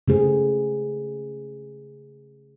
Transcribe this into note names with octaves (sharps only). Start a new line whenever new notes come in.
C#3 A3 G#4 C5